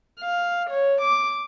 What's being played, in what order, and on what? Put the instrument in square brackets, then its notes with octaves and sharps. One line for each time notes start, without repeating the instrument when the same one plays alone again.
[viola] F5
C#5
D6